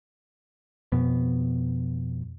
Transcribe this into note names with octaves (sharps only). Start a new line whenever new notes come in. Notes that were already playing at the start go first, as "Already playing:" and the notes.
F2 B2 B3